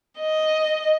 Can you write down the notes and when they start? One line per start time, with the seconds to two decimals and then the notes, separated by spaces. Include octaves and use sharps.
0.19 D#5